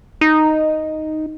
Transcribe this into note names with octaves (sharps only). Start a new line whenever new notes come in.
D#4